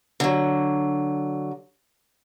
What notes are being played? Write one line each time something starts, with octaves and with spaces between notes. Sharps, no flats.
D3 F#3